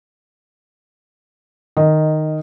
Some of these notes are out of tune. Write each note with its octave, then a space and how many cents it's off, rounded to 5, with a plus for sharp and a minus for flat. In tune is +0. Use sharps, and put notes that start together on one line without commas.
D#3 -10 D#5 +0